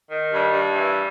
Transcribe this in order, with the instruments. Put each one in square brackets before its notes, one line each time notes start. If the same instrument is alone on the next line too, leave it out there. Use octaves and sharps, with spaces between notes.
[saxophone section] D#3
G2 G3
G2
E3